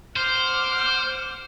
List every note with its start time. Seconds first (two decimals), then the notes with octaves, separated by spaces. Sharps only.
0.16 C5 F#5 D6 F6